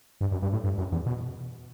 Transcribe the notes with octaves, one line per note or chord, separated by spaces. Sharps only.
G2
F#2
G2
A2
G2
F#2
E2
B2